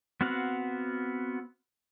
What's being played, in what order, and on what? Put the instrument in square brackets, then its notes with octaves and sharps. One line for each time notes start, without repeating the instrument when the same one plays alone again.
[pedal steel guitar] B3 C4 F#4 F5 F#5